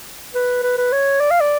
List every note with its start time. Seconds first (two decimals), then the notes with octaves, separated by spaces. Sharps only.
0.35 B4
0.63 B4
0.78 B4
0.92 C#5
1.20 D5
1.31 F5
1.40 D5